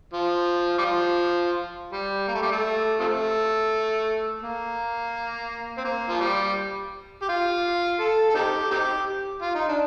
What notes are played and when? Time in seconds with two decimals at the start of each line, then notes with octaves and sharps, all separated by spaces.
0.13 F3
0.78 G3
0.85 F3
1.92 G3
2.28 A#3
2.35 A3
2.42 G3
2.51 A3
3.00 C3 F3 A3
4.42 A#3
5.78 C4
5.85 A#3
6.10 F3
6.21 G3
7.22 G4
7.29 F4
8.00 A4
8.30 A4
8.35 C4 D#4 G4
8.71 C4 D#4 G4
9.42 F4
9.55 D#4
9.69 D4